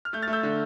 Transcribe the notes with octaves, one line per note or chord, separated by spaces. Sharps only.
F6
A3 G6
F6 A6
A3
E6 G6
D3